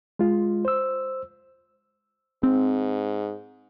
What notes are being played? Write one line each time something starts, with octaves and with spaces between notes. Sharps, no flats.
G#3 F4
C5 E6
G#2 C4